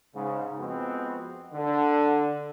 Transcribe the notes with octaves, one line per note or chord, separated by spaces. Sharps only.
G#2 C#3
F2 G#3 B3 C4 F#4
D3